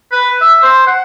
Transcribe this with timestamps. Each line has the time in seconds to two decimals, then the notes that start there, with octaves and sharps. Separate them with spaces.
0.12 B4
0.41 E5
0.62 C5
0.87 F#5